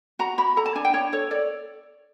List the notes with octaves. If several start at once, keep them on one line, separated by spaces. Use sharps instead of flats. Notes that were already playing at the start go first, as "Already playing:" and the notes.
F#4 A#5
F#4 B5
A4 A#5
A5
D4 G#5
G5
D4 C#5
A4 C#5
A4 D5